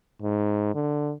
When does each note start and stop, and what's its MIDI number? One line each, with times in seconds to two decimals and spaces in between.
0.22 0.73 44
0.74 1.13 50